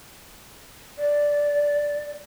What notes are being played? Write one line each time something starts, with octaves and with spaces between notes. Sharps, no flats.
D5